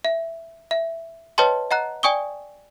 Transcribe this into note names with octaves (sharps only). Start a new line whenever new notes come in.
E5
E5
B4 C#5 D#5 G5 A5 C6
D#5 F#5 A#5 F#6
D5 G5 G#5 C#6 D#6 G7